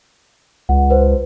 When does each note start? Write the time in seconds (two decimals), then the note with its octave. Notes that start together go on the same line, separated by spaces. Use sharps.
0.69 C#2 F#5
0.90 B4 C5